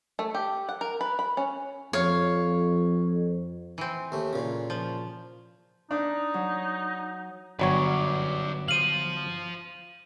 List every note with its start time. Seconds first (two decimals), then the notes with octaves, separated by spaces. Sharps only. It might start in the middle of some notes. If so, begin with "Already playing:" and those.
0.19 A3
0.35 G4
0.69 F#5
0.81 A#4
1.01 B4
1.19 B5
1.37 C#4
1.93 F2 C#5 F5
3.78 E3 C4
4.12 D#2 A3
4.33 A#2 C#3
4.70 F3
5.91 D4 D#4
6.34 F#3
7.59 G1 F#3 B4 C#5 D5
8.68 C5 F5 D#7 F#7